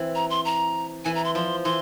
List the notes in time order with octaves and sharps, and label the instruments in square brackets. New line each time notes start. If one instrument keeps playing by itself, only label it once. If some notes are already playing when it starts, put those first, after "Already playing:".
Already playing: [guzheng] E3 C4
[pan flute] A#5
C6
A#5
[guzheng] E3 [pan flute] G#5
[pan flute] A#5
C6
[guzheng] F3 [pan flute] C6
[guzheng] E3 [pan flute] C6